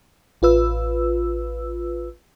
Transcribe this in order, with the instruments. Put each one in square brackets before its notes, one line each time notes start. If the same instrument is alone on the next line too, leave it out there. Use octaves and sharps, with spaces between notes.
[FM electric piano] A1 F4 B4 E6